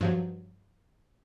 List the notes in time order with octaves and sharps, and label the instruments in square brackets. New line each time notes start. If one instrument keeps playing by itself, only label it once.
[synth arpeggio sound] G2 F3 F#3